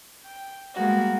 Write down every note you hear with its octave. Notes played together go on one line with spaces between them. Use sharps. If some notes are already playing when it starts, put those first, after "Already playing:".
G5
G3 G#3 A#3 B3 F#4